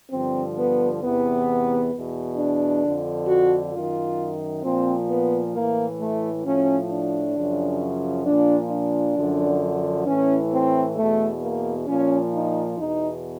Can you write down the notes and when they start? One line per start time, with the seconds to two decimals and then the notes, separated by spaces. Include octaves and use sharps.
0.11 G2 D3 F3 C4
0.56 B3
1.01 E2 C3 E3 B3
1.93 E2 B2
2.37 D4
2.83 F2 D3 F3
3.28 F#4
3.73 F#2 D#3 F4
4.63 A#2 F3 C4
5.09 B3
5.54 A2 E3 A#3
5.99 A3
6.44 A2 F3 C#4
6.90 D4
7.34 F#2 C#3 F3
8.25 A#2 F3 D4
8.71 D4
9.16 F#2 D3 F3
10.06 A2 E3 C#4
10.52 C4
10.96 E2 B2 A3
11.42 A#3
11.87 A#2 F3 C#4
12.33 D#4
12.78 E2 B2 D#4